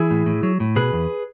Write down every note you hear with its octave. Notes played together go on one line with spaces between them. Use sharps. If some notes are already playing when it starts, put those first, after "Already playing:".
Already playing: E3 E4 G#4
A2
A2
F#3
A2
B2 G#4 B4
E2